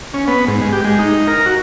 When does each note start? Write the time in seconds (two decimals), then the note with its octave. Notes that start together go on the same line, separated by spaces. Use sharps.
0.14 C#4
0.28 B3
0.48 G#2
0.61 G#3
0.73 G4
0.84 G#3
0.99 D#4
1.27 A#4
1.46 F#4